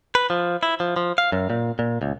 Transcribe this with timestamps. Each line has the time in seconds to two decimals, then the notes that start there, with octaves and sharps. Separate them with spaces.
0.15 B4
0.30 F3
0.63 E4
0.80 F3
0.96 F3
1.18 F5
1.32 F#2
1.50 A#2
1.79 A#2
2.02 C#2